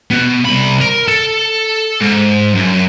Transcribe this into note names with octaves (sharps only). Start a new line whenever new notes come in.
B2 B3
C2 B5
A#4
A4
G#2
F#2